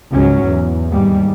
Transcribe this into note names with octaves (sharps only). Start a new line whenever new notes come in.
C#2 G#2 F#3 C#4
E2
D#2 G#2 G3